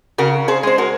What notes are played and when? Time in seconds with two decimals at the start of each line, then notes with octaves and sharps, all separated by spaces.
0.18 C#3 F#4 A#4
0.48 G#4 C5
0.63 G#3 C5
0.78 F#4 A#4